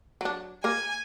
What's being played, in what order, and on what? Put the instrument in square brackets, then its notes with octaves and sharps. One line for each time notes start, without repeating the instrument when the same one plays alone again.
[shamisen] F#3 D4
[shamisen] A#3 A#4 [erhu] G#5